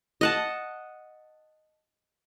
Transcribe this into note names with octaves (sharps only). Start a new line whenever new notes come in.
D#5 F#5 A5